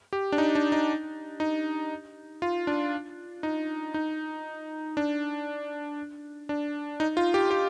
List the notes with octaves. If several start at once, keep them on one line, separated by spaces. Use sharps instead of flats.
G4
D4
D#4
D4
D#4
D#4
F4
D4
D#4
D#4
D4
D4
D#4
F4
G4
G4